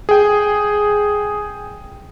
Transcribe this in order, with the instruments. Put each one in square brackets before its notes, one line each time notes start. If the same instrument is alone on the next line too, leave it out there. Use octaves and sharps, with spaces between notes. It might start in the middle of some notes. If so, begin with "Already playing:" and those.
[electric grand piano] G#4 G5